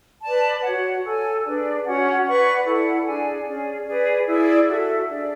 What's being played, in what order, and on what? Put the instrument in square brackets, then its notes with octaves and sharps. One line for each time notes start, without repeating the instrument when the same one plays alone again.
[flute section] B4 D5 A5
F#4 C#5 F#5
A4 C#5 G#5
D4 G#4 B4 D5
C#4 F#4 C#5 F#5
B4 D5 F#5 C#6
E4 A4 D5 F#5
D4 G#4 D5 G#5
C#4 G#4 D5
G#4 B4 D5
E4 G#4 D5
F#4 A4 E5
D4 G#4 D5